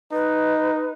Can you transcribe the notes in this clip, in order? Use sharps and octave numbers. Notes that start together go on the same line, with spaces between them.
D#4 B4